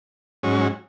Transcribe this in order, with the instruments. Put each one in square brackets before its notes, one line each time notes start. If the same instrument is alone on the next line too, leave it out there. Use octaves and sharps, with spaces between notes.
[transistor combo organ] G#2 F#3 C#4